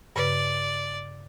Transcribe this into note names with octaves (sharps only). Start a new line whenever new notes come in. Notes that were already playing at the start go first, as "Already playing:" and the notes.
G2 C#3 B4 D5